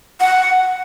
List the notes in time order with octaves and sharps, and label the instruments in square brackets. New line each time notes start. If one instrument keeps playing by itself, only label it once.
[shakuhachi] F#5